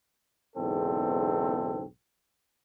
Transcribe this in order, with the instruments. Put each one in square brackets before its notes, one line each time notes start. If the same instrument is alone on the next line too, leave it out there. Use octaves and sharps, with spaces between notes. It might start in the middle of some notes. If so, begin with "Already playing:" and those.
[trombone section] B1 E2 G#2 C#3 C4 A4